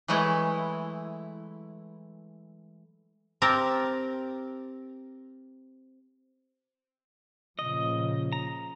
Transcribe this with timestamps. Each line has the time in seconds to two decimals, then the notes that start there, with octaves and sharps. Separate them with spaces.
0.08 E3 F#3 G#3 A3 E4
3.42 C4 G4 A#4 A5 A#5
7.59 A#2 C#3 F3 D#5
8.32 A#5